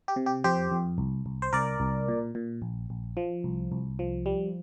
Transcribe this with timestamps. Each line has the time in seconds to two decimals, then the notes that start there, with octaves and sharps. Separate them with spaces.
0.08 G4
0.16 C3
0.26 G4
0.44 F2 G4 C5
0.72 F2
0.98 C2
1.26 C2
1.42 C5
1.53 C2 A#4 D5
1.80 C2
2.08 A#2
2.35 A#2
2.62 A#1
2.90 A#1
3.17 F3
3.44 C2
3.72 C2
3.99 F3
4.26 G3